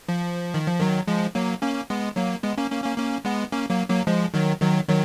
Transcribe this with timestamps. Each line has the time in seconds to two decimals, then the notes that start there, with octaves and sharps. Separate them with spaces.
0.09 F3
0.54 D#3
0.67 F3
0.80 D#3 F#3
1.08 F3 G#3
1.35 F#3 A#3
1.62 A#3 C#4
1.90 G#3 B3
2.16 F#3 A#3
2.43 G#3 B3
2.58 A#3 C#4
2.70 A#3 C#4
2.84 A#3 C#4
2.98 A#3 C#4
3.25 G#3 B3
3.52 A#3 C#4
3.70 F#3 A#3
3.89 F#3 A#3
4.07 F3 G#3
4.34 D#3 F#3
4.61 D#3 F#3
4.88 D#3 F#3